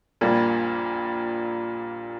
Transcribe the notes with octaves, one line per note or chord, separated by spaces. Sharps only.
A#1 A#2 G3 A#3